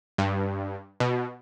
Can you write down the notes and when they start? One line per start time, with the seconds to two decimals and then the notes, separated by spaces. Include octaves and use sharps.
0.18 G2
1.00 B2